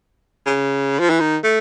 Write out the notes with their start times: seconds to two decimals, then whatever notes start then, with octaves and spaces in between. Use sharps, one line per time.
0.46 C#3
1.00 F3
1.10 E3
1.20 D#3
1.44 A3